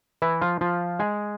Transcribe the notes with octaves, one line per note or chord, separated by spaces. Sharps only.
E3 E4
F3 F4
F3 F4
G#3 G#4